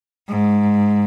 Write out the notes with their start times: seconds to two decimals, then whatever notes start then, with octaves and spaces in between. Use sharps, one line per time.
0.29 G#2